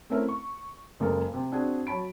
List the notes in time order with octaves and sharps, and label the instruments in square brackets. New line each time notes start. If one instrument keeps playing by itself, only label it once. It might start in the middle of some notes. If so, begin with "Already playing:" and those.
[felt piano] A3 C4 C#4 E4 A#4 E5
C#6
F#1 C#3 G#3 A#3 A4 A#4
C3
C4 D4 F#4 G#4
F#3 C#5 A5 B5 D7